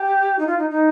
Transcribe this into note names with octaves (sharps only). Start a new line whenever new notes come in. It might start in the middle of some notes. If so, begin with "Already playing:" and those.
Already playing: G4
D#4
F4
D#4
D#4